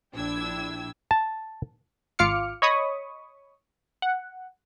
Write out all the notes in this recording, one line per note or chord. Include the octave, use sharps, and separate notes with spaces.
A#1 D4 E4 G5 E6 G#6
A5
G#1 F4 F5 D6 F6 C#7
C#5 D#5 B5 C#6 D#6
F#5